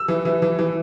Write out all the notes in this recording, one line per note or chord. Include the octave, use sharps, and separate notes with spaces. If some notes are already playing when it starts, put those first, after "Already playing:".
Already playing: E6
E3
E3
E3
E3